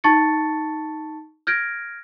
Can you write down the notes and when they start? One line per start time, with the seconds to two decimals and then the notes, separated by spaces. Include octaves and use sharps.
0.04 D#4 A5 C#6 A6 C#7
1.47 F6 G6 G#6 A#6 D7